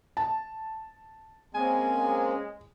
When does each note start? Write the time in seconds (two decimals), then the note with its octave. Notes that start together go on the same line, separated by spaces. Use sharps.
0.17 A5
1.55 G#3 A#3 C4 C#4 G#5
1.97 G#3